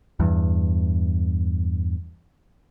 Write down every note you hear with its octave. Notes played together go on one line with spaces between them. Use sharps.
E2 G2